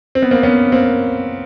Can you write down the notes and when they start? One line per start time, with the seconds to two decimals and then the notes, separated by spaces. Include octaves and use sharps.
0.15 C4
0.22 B3
0.31 A#3 C4
0.43 B3 C#4
0.72 A#3 C4